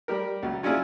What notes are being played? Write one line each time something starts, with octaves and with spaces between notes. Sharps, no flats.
G3 G4 A#4
C#2 F#3
F#3 C#4 D4 E4 F4 G#4